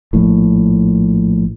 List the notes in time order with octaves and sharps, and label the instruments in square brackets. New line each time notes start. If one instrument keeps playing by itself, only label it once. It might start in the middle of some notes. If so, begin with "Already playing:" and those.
[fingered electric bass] A#1 A2